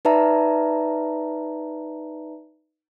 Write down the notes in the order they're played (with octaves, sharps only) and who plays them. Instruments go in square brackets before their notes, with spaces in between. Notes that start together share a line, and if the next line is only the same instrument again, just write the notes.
[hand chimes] D#4 B4 D5 E5 A5 A#5